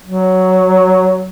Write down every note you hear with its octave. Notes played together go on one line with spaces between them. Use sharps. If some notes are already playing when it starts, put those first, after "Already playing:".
F#3